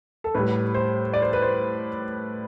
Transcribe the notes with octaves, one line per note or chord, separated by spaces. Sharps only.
A4
A2 G3 B4
C5
D5
C5
B4
C5